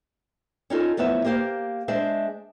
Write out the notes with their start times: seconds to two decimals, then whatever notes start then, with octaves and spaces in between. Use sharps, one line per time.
0.70 C#4 D#4 F4 A4
0.97 F3 F#3 A3 B3 E4 E5
1.25 A#3 G4 C5 F5
1.88 G#3 D4 C5 E5